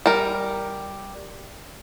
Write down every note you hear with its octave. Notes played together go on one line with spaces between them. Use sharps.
G3 A#4